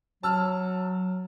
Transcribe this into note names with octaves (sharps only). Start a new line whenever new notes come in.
F#3 A5 E6 F6